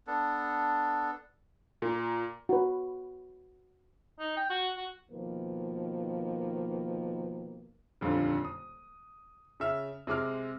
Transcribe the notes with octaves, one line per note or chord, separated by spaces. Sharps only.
B3 D4 A4
A#2
F#4 B4
D#4
G5
F#4
F#4
B2 D#3 F3 A#3 B4
D#1 F2 D3 F4
D#6
C#3 E5 F6
C3 G#3 D6 F6